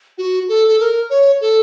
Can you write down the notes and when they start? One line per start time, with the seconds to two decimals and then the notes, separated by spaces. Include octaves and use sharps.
0.18 F#4
0.49 A4
0.68 A4
0.80 A#4
1.10 C#5
1.41 A4